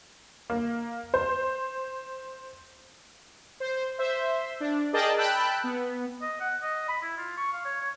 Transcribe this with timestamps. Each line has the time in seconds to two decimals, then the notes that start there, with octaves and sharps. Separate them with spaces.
0.50 A#3
1.14 C5
3.60 C5
3.98 C5 E5
4.60 D4
4.93 G#4 A#4 D5 D#5 G5 A5
5.18 G5 A5 B5 E6 F#6
5.64 B3
6.22 D#5
6.40 F#5
6.62 D#5
6.89 B5
7.02 E4
7.17 F4
7.37 C#6
7.53 F5
7.65 C#5
7.81 C#5